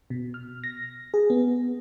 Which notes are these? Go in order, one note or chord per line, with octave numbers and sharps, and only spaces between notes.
B2
F6
A#6
G#4
B3